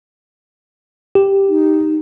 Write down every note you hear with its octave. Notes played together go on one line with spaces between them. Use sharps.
G4
D#4